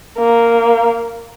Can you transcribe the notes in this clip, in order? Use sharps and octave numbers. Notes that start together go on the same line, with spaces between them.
A#3